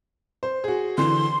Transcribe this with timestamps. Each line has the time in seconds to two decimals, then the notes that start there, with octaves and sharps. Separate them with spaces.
0.43 C5
0.64 F#4 G#4
0.98 D3 E3 C6